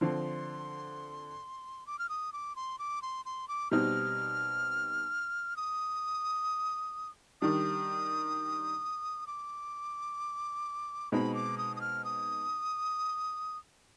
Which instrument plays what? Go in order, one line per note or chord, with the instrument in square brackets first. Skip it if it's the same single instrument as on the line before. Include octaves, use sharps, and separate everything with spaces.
[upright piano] D3 F3 C4 [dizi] C6
[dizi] D6
F6
D#6
D6
C6
D6
C6
C6
D6
[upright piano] B2 G3 C4 D#4 [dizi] F6
[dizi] D#6
[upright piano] D#3 G3 D4 [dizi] D#6
[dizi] D6
[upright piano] B2 G#3 C4 D#4 [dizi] B5
[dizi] D6
D#6
D#6
F6
D#6